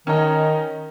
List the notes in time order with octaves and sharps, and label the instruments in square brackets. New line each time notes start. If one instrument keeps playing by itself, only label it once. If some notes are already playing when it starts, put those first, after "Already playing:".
[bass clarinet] D#3 [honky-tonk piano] C#4 D#4